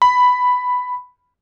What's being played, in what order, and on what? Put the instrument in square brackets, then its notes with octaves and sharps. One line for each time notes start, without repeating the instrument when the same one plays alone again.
[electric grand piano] B5